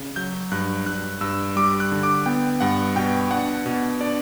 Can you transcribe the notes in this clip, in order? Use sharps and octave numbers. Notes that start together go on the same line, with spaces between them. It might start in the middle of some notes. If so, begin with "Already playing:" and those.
Already playing: C#3
F#3 G6
G2 F#6
G2 F#6
G2 E6
G3 D6
F#6
D3
D6
B3 G5
G2 F#5
B2 G5
D4 F#5
B2
D4 D5